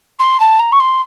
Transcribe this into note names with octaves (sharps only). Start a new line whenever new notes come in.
C6
A5
A#5
C#6
C6